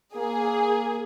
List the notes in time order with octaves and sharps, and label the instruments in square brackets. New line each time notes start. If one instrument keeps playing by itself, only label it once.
[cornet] A#3 [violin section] G#4